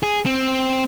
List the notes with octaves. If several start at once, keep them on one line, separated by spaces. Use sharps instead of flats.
G#4
C4